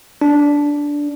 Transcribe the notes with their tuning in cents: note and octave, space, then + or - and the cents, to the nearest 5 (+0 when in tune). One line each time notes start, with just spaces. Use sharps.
D4 -10